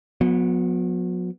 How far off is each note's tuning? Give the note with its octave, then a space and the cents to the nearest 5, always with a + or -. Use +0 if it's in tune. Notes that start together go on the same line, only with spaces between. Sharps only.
F#3 -40 B3 -10